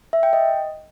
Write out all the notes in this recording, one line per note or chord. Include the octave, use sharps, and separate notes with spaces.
E5
G5
D#5